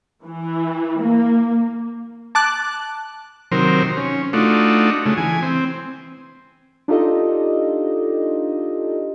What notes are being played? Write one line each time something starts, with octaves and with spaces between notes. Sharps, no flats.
E3
A#3
A5 D6 F#6
C3 D#3 F#3 A#4 C5
C#4
A3 D4 D#4 F4 F#4
C#3 G#3 A3
E3 G#5
C4
D4 D#4 F4 G4 A4 D#5